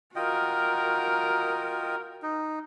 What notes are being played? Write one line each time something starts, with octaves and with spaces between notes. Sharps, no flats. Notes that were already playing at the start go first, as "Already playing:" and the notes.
F4 F#4 A#4 D#5 G5
D#4